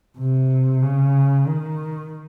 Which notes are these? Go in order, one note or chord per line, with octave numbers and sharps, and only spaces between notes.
C3
C#3
D#3